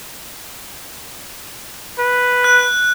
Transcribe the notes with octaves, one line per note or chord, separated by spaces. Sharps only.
B4
F#6